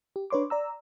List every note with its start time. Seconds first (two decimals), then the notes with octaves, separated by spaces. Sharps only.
0.16 G4
0.30 D4 B4 C#5 C6 D6
0.50 D5 A#5 E6